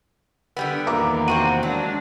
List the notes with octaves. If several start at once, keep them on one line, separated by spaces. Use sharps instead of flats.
D3 G3 B3
E2 D#3 A#3 E5 A#5 D6
C3 C4 F#4 D#7
F#3 G#3 D4